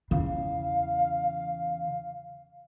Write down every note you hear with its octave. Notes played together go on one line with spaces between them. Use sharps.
E2 C#3 F5